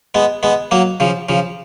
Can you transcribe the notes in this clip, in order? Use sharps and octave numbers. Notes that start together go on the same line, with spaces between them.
G#3 B3
G#3 B3
F#3 A#3
C#3 F3
C#3 F3